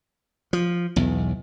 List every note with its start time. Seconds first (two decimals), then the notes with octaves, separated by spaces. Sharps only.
0.53 F3
0.96 B1 E2